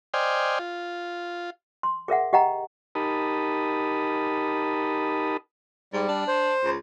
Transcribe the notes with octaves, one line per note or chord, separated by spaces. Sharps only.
C5 D5 D#5 G5 G#5 F6
F4
C6
G#4 A#4 E5 F#5
G4 D#5 F#5 G5 A#5
D#4 G4 A#4 A5 B5 D#6
G#2 G3
D4
C5
C#2